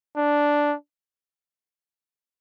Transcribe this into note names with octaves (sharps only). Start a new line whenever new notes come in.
D4